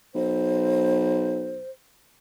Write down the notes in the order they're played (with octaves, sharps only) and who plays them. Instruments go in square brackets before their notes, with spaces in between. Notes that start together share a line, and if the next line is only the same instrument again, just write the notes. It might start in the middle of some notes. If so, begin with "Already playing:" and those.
[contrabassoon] B1 [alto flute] C5